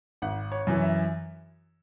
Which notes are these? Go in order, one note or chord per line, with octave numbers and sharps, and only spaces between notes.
G#1 F#5
C#5
F#2 E3 C#5
E5